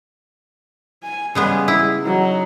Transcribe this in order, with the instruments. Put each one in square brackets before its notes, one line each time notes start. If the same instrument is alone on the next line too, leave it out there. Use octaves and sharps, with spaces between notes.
[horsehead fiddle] G#5
[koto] C#3 G#3 B3 [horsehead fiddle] G3 G#4
[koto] E4
[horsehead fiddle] F#3 D#4